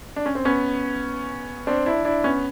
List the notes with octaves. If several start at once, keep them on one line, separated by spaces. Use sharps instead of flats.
D4
C#4
C4
B3 C#4
C4 D4
D4 E4
D4 E4
B3 C#4